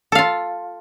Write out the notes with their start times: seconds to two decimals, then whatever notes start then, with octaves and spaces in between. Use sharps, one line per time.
0.12 A4
0.15 F5
0.19 F4